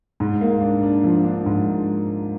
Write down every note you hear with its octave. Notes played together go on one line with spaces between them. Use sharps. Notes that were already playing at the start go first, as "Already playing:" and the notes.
G#2
A#3
D4
D4
F3
D4
G#2